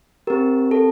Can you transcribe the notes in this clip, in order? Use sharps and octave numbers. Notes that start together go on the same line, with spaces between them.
C4 G4 A#4
A4